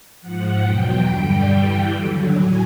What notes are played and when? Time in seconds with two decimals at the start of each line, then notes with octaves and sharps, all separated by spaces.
0.21 G#2 F3 F#5
0.63 E2 B2 F#3 G5
1.06 G2 D3 G3 G5
1.48 G2 E3 G3
1.91 D#2 D3 F#3
2.34 A2 F#3 G#5